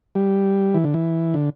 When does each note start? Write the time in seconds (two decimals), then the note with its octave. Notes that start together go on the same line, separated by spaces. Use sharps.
0.15 G3
0.74 E3
0.84 D3
0.94 E3
1.34 D3